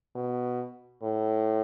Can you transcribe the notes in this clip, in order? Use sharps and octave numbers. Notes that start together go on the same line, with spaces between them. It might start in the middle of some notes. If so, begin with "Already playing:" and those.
B2
A2